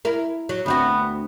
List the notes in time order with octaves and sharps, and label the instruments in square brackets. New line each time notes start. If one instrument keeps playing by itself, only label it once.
[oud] E4 A#4
F#3
[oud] D2 C4 F#4 [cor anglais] B3